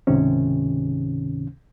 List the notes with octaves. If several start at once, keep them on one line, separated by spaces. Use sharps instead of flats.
C#2 G#2 C3 D#3 C#4